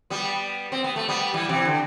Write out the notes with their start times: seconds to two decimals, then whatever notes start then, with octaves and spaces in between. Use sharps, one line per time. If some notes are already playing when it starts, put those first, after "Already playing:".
0.10 G3 B3
0.72 C4
0.84 B3
0.96 A3
1.08 G3 B3
1.34 E3 G3
1.49 C3 E3
1.65 D3